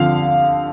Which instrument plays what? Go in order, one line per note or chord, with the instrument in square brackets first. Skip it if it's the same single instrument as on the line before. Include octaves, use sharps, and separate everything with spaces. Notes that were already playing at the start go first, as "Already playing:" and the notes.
Already playing: [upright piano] D3 F3 C4 [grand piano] F5